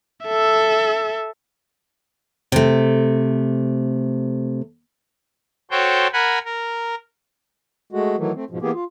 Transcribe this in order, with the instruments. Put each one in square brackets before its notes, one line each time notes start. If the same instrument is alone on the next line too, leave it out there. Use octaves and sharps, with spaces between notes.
[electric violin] A4 E5
[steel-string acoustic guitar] C3 A3
[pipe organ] F#4 A4 C5 C#5 G5
A#4 F#5 G#5 B5
A#4
[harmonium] G#3 A3 F#4
D#3 E3 F#3 A3
A3 C4
G#2 B2 F3
E3 A#3 B3 G4 G#4
F4